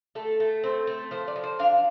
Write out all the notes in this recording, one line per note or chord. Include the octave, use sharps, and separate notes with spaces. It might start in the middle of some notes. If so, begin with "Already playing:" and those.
A3 A4
A3
C4
A3
F3 C5
D5
F3
C5
D4 F5